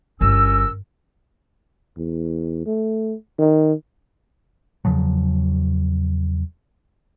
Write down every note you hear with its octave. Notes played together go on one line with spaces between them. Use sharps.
G1 C#4 A#4 E6
E2
A3
D#3
E2 C#3 F3 F#3